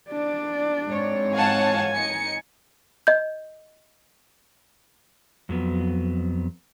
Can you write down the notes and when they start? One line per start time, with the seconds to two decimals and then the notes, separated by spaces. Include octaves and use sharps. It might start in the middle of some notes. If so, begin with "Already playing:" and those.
0.10 D4 D5
0.86 G#2 C4 C#5
1.34 F5 F#5 G#5 A5
1.95 D#4 C#7
3.07 D#5 G6
5.49 F2 F#3 B3